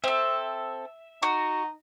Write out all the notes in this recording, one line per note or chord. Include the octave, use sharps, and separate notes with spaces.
C4 A4 E5
D#4 F#4